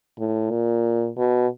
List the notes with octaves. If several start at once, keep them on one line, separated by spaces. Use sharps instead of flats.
A2
A#2
B2